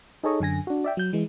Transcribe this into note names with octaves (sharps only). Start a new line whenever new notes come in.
D#4 G#4 A4 C#5 D#5
F#2 D3 G#5 A#6
D4 F#4
D5 E5 G5
F#3 G6
E3 G#3